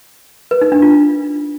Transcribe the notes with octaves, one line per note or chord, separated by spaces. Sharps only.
B4
D#4
D4
F4